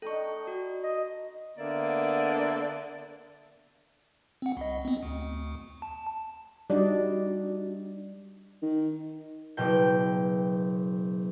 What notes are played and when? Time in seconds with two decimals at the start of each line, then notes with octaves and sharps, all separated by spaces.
0.02 D4 D#4 A4 G5 C#6
0.47 F#4
0.83 D#5
1.58 D3 A#3 B3 D5 E5
4.42 C4 F#5
4.57 C2 D#5
4.85 B3 C4
5.03 D2
5.82 A5
6.70 G3 D4 D#4 F#4 D5 D#5
8.62 D#3
9.57 F#1 B2 G5